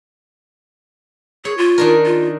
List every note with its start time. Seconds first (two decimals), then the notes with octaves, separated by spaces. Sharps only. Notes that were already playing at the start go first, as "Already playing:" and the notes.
1.45 G#4 C#5
1.58 F4
1.78 D#3 D4 A#4
2.06 F4